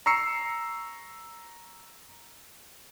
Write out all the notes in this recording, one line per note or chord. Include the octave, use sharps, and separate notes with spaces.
A#5 C#6 E6 C7 C#7